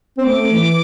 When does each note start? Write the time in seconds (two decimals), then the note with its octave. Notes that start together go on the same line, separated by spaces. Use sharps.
0.18 C4
0.26 A3 D6
0.51 E3